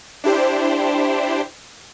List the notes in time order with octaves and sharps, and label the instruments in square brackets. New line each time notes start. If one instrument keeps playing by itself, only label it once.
[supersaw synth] D4 E4 G4 C5